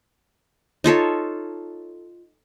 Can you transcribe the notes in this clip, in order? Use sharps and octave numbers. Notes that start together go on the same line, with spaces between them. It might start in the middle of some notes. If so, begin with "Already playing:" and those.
D#4 F4 A4 C#5